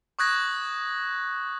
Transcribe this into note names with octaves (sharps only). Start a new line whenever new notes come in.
C#6 D#6 F#6 G#6 A#6